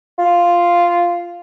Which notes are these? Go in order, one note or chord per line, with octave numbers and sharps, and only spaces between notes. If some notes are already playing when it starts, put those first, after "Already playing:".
F4